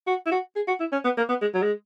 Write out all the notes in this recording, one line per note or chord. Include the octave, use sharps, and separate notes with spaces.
F#4
E4
F#4
G#4
F#4
E4
C#4
B3
A#3
B3
G#3
F#3
G#3